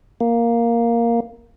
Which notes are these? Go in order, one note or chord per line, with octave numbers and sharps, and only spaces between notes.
A#3